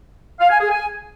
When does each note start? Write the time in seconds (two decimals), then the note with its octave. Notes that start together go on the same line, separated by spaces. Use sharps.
0.40 F5
0.50 G#5
0.60 G#4
0.70 G#5